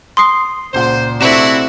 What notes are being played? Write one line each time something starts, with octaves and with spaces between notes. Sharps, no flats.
C6 D#6 C7
C#2 A#2 C5 F#5
C3 A3 C4 D4 E4 F#4 E7